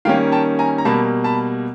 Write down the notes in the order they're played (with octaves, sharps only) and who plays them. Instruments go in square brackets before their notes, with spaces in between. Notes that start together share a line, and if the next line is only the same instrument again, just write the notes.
[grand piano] D#3 G3 A#3 C#4 F5 G5
G5 A5
G#5 A#5
A#5
B2 G3 A#3 A5 B5
A5 B5